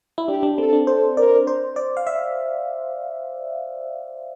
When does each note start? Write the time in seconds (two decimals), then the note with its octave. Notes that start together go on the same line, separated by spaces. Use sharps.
0.18 E4
0.28 D4 G4
0.43 D4
0.58 C4 A4
0.73 D4
0.87 A4 C5
1.17 A#4 D5
1.47 C5
1.76 D5
1.97 F5
2.07 E5